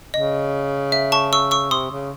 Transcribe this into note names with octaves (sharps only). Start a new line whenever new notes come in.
C#3 D#5
E5
A5 C#6
C#6 E6
C#6 E6
C3 C6 D#6
C#3